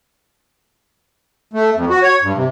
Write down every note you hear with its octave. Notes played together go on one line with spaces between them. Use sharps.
A3
F2
F#4
C#5
G2
C3